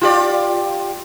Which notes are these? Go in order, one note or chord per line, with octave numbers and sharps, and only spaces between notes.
F4 G4 D5